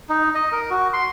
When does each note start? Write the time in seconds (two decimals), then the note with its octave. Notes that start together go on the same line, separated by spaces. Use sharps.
0.09 D#4
0.35 D#5
0.52 A#4
0.70 F#4
0.93 C6